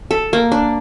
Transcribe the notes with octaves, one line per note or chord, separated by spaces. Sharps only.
A4
A#3
D4